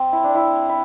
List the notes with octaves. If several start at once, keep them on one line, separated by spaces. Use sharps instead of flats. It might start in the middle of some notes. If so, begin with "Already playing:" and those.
Already playing: C4
E4
D4
E4
E4